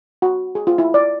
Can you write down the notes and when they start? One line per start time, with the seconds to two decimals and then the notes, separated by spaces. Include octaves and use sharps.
0.22 F#4
0.55 G#4
0.67 F4
0.78 E4
0.94 D5